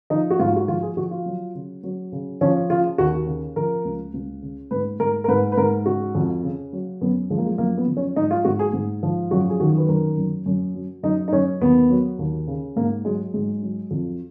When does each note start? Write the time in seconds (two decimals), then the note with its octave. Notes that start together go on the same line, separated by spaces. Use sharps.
0.10 F3 D#4
0.30 F#4
0.39 G#2 F4
0.56 F#4
0.68 F3 F4
0.82 G#4
0.97 F3 F#4
1.11 F4
1.26 F#3
1.55 C#3
1.83 F#3
2.12 C#3
2.41 F3 C#4
2.70 C#3 F4
2.98 D#2 F#4
3.27 C#3
3.56 F3 A#4
3.85 C#2
4.14 C#2
4.42 C#3
4.71 G#2 B4
5.00 G#2 A#4
5.24 A#4
5.28 G#2 B4
5.52 B4
5.57 G#2 A#4
5.86 C#3 F#4
6.15 F2
6.43 C#3
6.73 F#3
7.01 F#2 B3
7.30 F3 G#3
7.38 A#3
7.46 G#3
7.58 F#2 A#3
7.78 B3
7.87 F3
7.97 C#4
8.16 G#2 D#4
8.31 F4
8.45 G#2 F#4
8.59 G#4
8.73 G#2
9.03 F3
9.31 F#2 F#4
9.50 G#4
9.60 D#3 F#4
9.77 B4
9.89 F#2 A#4
10.17 F#2
10.46 F#2
10.75 F#3
11.03 F#2 D#4
11.28 D#4
11.32 F#2 C#4
11.61 D#2 B3
11.90 F#3
12.19 D#2
12.47 C#3
12.76 G#2 A#3
13.05 F#3 G#3
13.34 G#2 G#3
13.63 F#3
13.91 F2